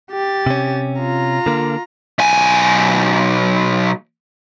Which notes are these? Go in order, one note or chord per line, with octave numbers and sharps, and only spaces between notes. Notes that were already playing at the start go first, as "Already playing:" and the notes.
G4 A6
C3 C#4
F4 A#5
D3 A#3
B1 G#5